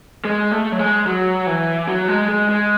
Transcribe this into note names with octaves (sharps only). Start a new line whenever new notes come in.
G#3
A3
F#3
G#3
F#3
E3
F#3
G#3
G#3
G#3